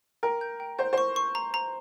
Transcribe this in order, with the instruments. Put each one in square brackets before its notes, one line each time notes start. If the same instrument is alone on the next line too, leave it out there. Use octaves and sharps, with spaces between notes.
[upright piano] A#4 [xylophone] G5
[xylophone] G6
G5
[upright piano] C5 [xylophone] G6
[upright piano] C5 [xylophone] C#6
[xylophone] C#6
A#5
A#5